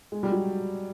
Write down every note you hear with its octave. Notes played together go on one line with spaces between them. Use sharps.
G#3
G3
F#3